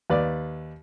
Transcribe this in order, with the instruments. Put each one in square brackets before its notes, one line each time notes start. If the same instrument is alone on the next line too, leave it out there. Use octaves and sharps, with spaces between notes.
[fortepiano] D#2 B4 D5